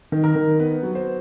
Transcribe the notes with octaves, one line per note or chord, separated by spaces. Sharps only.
D#3
A#4
D#3
B3 B4
F#3
C5